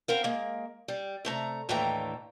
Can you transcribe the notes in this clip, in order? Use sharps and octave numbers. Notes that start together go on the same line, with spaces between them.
B3 C4 A#4 F5
G#3 A#3
G3
C3 A3 A#5
D#2 A2 D3 E3 G5 A#5